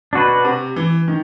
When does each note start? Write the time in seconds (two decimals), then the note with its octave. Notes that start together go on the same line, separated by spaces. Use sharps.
0.13 B2 D4 F#4 B4
0.45 C3
0.76 E3
1.08 D#3